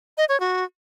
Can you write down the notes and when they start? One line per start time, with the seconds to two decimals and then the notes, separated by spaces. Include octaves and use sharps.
0.18 D#5
0.29 C#5
0.40 F#4